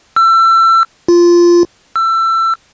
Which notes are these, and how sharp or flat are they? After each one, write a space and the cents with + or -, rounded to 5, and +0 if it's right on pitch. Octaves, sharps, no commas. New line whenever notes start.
E6 +30
F4 -10
E6 +25